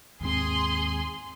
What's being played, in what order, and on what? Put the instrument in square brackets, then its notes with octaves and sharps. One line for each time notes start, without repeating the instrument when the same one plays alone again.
[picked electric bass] D#2 G#2 C4 [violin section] G#4 C6